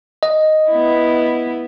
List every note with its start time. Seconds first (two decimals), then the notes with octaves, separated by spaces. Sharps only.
0.23 D#5
0.71 B3 E4